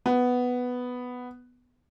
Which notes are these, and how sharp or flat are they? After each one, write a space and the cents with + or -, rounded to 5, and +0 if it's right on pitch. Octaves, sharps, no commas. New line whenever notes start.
B3 +5